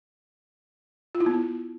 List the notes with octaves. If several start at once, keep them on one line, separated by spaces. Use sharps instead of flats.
F4
E4
B3